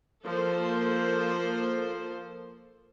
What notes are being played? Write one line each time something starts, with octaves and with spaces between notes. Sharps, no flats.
F3 A#3 A4 C5